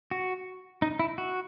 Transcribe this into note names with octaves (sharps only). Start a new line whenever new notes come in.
F#4
D#4
E4
F#4